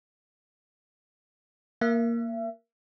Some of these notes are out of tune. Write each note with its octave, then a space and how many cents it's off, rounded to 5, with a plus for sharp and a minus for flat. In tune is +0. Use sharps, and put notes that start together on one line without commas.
A#3 +0 E5 +35